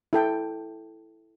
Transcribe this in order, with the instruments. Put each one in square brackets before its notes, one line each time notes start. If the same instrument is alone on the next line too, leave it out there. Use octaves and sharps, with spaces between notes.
[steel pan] E4 A4 G5